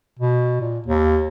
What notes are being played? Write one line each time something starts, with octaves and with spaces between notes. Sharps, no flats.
B2
A#2
D#2